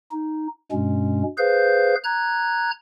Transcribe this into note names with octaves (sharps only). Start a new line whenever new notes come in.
D#4
G2 B2 G#3 C#4
G#4 B4 C5 F5 G6
A#5 F#6 G#6